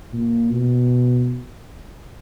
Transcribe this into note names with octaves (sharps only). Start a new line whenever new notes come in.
A#2
B2